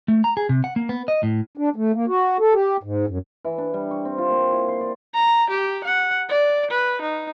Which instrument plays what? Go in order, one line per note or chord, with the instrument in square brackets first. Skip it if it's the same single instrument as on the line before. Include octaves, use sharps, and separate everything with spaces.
[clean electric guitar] A3
A#5
G#4
C3
F#5
A#3
B3
D#5
A2
[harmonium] D4
A3
A#3
F#4
A4
G4
G#2
F#2
[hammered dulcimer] E3
D4
G3
C#6
C4
F4
A#3
E4
C6
D5
[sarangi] A#5
G4
F#5
D5
B4
D#4